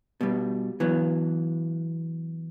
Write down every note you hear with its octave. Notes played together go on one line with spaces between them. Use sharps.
B2 G3
E3 F#3 B3